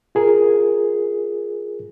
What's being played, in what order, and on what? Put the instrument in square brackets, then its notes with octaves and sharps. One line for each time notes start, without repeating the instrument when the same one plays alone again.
[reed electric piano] F4 G#4 A#4